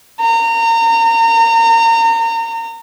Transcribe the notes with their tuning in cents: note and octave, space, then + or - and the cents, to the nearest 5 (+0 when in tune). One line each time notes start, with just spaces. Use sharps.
A#5 -30